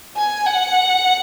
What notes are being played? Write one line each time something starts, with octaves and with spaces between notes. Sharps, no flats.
G#5
F#5